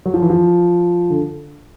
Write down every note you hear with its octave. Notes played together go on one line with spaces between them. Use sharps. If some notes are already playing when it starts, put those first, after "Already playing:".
F#3
F3
E3
F3
D3